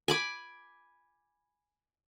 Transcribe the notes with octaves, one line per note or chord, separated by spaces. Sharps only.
G#5 B5 D6